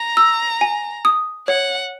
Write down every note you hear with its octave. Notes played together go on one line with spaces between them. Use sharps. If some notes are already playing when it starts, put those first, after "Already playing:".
Already playing: A#5
E6
G#5
D#6
C#5 F#5